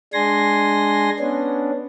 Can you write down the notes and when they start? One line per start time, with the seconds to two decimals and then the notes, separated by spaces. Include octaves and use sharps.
0.13 G#3 D4 G#5 C6 A#6
1.19 B3 C#4 D4